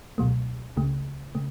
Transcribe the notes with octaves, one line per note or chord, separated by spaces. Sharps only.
C#2 B2 F#3 A3
C#2 C#3 A3
C#3 A3